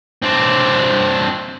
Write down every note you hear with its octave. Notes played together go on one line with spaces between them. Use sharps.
C4 D4